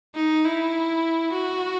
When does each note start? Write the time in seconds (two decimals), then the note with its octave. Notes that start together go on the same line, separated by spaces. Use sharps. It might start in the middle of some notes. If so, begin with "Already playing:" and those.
0.15 D#4
0.45 E4
1.33 F#4